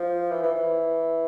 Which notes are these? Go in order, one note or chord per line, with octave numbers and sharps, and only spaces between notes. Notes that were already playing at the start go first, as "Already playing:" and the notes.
Already playing: F3
E3
E3
E3